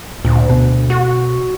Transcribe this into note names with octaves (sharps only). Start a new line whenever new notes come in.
D2 A#2
B2
F#4